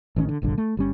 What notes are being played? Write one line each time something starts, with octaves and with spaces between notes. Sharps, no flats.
A1 D#3 A3 C#4
D3
F1 A#1 G2 D3
A3
G1 G3 C#4